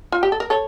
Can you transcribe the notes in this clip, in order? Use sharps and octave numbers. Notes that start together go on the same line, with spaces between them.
F4
G4
A4
A#4
A4 C#5